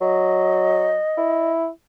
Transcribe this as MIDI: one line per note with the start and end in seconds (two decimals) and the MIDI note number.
0.01 0.97 54
0.01 1.51 75
1.17 1.68 64